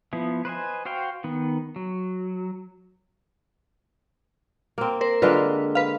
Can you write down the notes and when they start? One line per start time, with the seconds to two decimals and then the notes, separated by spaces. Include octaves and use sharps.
0.13 F3 B3 E4
0.45 B4 C5 D#5 G#5
0.85 F#4 C5 F5 G5
1.24 D#3 B3
1.76 F#3
4.78 A#3 C4
5.01 A#4 C5
5.22 D3 G#3 A#3 F4 B4
5.75 B4 F5